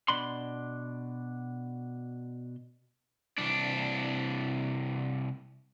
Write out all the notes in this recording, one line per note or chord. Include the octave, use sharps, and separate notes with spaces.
B2 D4 B5 C6
C2 D4